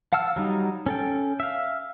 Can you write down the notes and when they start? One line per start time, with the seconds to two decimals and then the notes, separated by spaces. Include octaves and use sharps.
0.13 F5 F#5 A5 E6 F6
0.36 F#3 G3 D#4
0.86 C#4 A4 G5
1.40 E5 F5